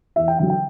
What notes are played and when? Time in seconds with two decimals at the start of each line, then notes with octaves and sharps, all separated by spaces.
0.16 E2 E5
0.28 G5
0.39 D3 F#3 G5
0.50 G5